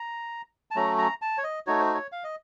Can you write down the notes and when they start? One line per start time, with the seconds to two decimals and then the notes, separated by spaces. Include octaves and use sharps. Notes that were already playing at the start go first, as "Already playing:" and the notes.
Already playing: A#5
0.71 A5
0.76 F#3 A3 C#4 A#5
0.98 A#5
1.22 A5
1.38 C#5
1.44 D#5
1.67 A3 D#4 F#4 C#5
1.80 C5
1.94 C#5
2.12 F5
2.24 D#5